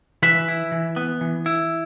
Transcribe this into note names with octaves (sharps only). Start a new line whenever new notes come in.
E3 B4 E5
E4
E3
B3
E3
E4